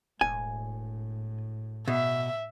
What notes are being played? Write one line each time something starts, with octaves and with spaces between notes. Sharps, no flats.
E1 A2 G#5
B2 E5